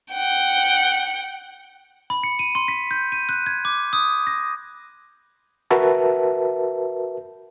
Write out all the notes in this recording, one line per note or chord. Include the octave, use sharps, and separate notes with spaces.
F#5 G5
B5
C#7
D#7
C6
B6
G6
D#7
F#6
G#6
D6
D#6
A#6
F#4 A#4 B4 E5 A5